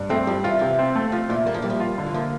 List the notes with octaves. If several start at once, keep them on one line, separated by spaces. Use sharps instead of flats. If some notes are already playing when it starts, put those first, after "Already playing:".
Already playing: G2
F3 A3 C4
F3 G3
E3 F4
C3 E3
C4
A3
F3 F4
A#2 E3
G3 A#3
F3
E3 G3
F3
F4
D3
E3
F3 A#3